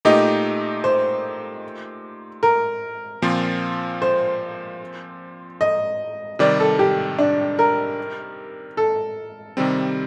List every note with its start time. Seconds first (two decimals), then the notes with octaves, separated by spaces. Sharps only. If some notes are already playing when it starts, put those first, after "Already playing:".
0.05 A#2 A3 D#4 G4 D#5
0.84 C5
2.43 A#4
3.22 A#2 F3 C4 F4
4.02 C5
5.61 D#5
6.39 C3 D#3 G3 D5
6.60 A4
6.79 G4
7.18 D4
7.59 A#4
8.77 A4
9.57 C3 D#3 G3 C4